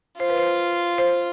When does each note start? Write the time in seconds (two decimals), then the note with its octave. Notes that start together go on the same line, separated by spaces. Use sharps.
0.20 F4 C5
0.30 B4
0.38 C5
0.98 C5